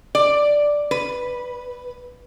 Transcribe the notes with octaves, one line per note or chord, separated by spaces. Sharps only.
D5
B4